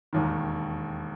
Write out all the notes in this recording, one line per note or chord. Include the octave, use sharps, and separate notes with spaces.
E1 D#2 D#3